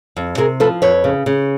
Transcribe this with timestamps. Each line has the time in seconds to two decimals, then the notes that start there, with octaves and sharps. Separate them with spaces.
0.17 F2
0.37 C3 G#4 A#4
0.60 F3 A4 B4
0.82 F2 B4 C#5
1.04 C#3
1.26 C#3